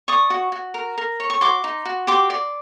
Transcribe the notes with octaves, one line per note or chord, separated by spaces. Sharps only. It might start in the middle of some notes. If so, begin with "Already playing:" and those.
D5 C#6 D#6
F#4
F#4
A#4
A#4
C#5
C#6
F#4 C6 D6
D#4
F#4
G4 C6 D6
D5